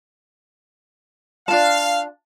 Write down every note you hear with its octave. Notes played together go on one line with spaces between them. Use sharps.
D4 F4 F5 A5